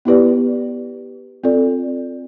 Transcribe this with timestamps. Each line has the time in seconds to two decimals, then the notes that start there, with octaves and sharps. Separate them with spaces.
0.05 B3 E4 G4 B4 D5
1.44 C4 F4 A4 D5